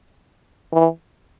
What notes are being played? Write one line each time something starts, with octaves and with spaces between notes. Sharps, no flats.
E3